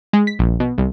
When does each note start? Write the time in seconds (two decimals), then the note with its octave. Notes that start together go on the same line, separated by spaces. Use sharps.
0.13 G#3
0.27 B6
0.39 A#1
0.60 B2
0.78 C2